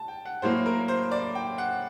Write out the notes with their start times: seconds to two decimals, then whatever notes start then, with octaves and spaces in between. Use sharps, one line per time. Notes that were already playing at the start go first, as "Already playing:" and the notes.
Already playing: A5
0.08 G5
0.25 F#5
0.42 A2 F#3 A#3 C5
0.66 A#4
0.88 C5
1.11 D5
1.35 G5
1.58 F#5